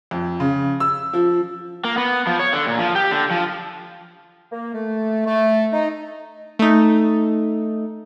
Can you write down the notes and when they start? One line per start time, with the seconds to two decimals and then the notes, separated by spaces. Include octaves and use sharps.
0.11 F2
0.40 C#3
0.80 E6
1.13 F3
1.84 A#3
1.97 B3
2.27 F3
2.39 C#5
2.53 D3
2.67 A#2
2.79 F3
2.95 G4
3.11 D3
3.31 F3
4.51 A#3
4.74 A3
5.26 A3
5.71 D#4
6.59 A3 D#4